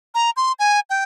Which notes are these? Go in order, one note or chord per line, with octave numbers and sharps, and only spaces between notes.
A#5
C6
G#5
G5